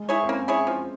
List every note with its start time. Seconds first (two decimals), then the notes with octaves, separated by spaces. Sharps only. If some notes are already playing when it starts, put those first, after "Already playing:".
Already playing: G#3
0.09 E4 G#4 C#5
0.23 C4
0.29 A#3 C#4
0.48 E4 G#4 C#5
0.67 F3